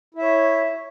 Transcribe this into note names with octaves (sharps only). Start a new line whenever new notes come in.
E4 C#5 E5